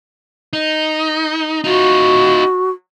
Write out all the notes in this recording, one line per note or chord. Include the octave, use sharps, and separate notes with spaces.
D#4
D#4 F4 F#4